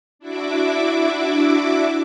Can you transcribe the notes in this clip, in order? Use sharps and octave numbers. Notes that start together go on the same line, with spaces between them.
D4 E4 F#4 E5 D6